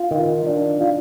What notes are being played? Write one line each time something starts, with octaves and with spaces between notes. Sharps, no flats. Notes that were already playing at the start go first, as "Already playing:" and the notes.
Already playing: F4
D#3
D4
F4